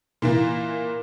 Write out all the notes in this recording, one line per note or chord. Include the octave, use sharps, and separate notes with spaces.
A#2 E3 A#3